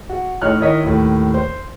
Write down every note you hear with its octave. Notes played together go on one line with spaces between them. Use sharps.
F#4
A2 D#4 C#5 F6 F#6
D#3 E4 C#5 D#5 B6
D#2 A2
C5